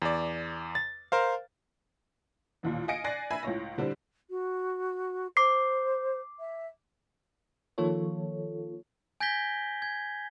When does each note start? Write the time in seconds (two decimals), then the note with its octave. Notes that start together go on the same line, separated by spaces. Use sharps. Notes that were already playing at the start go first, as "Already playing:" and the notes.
0.02 E2 D5
0.75 A6
1.12 A#4 C5 F5
2.63 A1 D#2 A#2
2.88 D#5 F5 G#5 A#6 C#7 D7
3.04 D5 G#5 F#6 A6 A#6 C7
3.31 E5 G#5 B5
3.43 C#2 A2 C#5 A#6
3.77 A2 D3 G3 C4
4.30 F#4
5.37 C5 D6 C7
6.39 E5
7.78 D#3 F3 A#3 F4 A4 C#5
9.20 G#5 G6 G#6 A#6 B6 G7
9.82 G#6